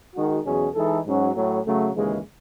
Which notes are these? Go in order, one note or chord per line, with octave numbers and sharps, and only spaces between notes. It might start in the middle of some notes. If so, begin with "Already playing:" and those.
D#3 G#3 D#4 F#4
E2 B2 F#3 C#4 G#4
E3 G#3 D#4 A4
G#2 F#3 C#4 F#4
A2 F#3 A3 C#4
C#3 F#3 A3
D#2 C#3 E3 G#3